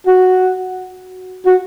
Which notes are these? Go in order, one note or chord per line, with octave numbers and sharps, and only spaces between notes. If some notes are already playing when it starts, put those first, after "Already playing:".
F#4
F#4